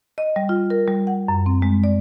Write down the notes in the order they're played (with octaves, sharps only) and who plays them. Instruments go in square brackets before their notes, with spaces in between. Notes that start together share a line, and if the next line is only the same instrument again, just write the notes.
[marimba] D#5
G3
F4
A#4
G3
F#5
F#2
C4
G#3
D5